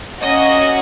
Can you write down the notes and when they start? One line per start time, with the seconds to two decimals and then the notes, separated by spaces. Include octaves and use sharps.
0.21 A#3 C#4 F#4 D#5